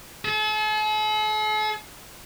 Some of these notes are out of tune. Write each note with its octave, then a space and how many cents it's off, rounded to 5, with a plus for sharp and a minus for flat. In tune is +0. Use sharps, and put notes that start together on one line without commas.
A4 -45